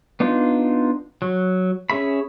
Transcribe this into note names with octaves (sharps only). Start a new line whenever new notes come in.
B3 D4 D#4 F4
F#3
C#4 G#4 E5 B5